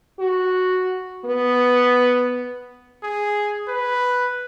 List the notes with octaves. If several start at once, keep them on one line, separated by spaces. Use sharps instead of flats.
F#4
B3
G#4
B4